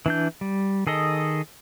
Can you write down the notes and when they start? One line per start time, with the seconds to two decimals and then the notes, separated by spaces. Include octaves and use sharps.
0.06 E3 D4 G6
0.41 G3
0.87 D#3 G#4 A4 D#5